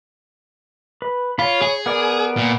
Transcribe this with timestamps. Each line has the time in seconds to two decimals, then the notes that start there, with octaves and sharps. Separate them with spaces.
1.02 B4
1.39 F4 C#5 B5
1.62 G#4
1.86 B3 A#4 D5
2.37 A#2